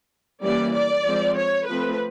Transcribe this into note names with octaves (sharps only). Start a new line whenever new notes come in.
E3 G3 A#3 C#4 D5
D5
F3 G#3 C4
C#5
F3 A3 C4 B4